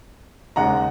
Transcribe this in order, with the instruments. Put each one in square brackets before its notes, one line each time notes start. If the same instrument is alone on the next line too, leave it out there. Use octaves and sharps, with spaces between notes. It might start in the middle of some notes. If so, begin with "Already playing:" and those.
[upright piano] D#2 C#3 G#3 F#5 A#5